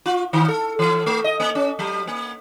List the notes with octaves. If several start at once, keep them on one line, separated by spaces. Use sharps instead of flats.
F4
D#3
A4
E3
A3
D#5
A#3
C#4
F#3
A#3